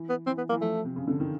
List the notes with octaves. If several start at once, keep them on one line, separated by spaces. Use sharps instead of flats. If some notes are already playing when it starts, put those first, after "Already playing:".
Already playing: E3
B3
E3 C4
B3
E3 A#3
F3 A3
C3
C#3
D3
D#3